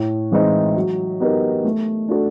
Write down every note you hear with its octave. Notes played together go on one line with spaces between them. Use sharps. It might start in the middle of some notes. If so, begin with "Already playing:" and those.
Already playing: A2
E3 G#3 C4 D#4
F#3
B3 D#4 G4 A#4
A3
D4 F#4 A4